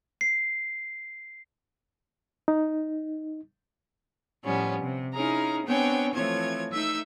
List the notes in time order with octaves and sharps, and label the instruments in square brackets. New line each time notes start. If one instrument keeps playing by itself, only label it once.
[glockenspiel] C7
[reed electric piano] D#4
[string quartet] A2 F3 G3 B3 C#4
C3
C#4 D#4 E4 G#4 A#4 A#5
B3 C4 D4 C#5 G5 G#5
E3 F3 A3 C4 C#5 G#6
A3 D#4 E5 E6 G6